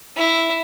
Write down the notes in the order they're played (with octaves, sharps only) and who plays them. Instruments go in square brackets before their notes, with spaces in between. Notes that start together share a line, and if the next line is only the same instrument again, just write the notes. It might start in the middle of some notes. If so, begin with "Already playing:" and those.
[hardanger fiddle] E4